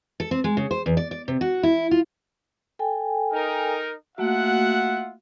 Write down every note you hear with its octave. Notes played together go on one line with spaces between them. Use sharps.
A4
C4
G#3
C#3
C5
E2
D5
D5
C3
F#4
E4
F4
A4 G5 G#5
D#4 A#4
A3 A#3 F4 F#4 E5 F#5